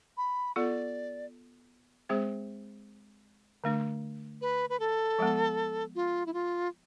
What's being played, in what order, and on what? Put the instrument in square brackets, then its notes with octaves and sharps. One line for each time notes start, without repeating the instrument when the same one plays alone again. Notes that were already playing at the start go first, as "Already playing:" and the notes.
[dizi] B5
[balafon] B3 F4 A4 [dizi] D5
[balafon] G#3 C4 G#4 C5
D3 A3 D4
[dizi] B4
B4
A4
[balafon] F3 G#3 B3
[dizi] F4
E4
F4